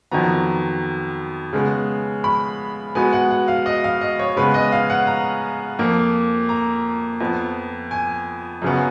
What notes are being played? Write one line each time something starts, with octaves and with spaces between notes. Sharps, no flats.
F2 D#3 F#3 B3 A#5
C#3 G#3 B3
B5
B2 G#3 B3 G#5
F#5
F#5
F5
D#5
F5
D#5
C#5
C#3 G#3 B3 B4
D#5
F5
F#5
A#5
F2 F3 A#3
A#5
F2 F3 B3
G#5
F#2 C#3 F#3 B3